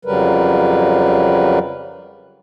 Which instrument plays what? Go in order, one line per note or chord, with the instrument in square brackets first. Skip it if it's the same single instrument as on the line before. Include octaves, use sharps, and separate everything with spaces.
[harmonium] F2 C#3 F#3 G3 A#4 B4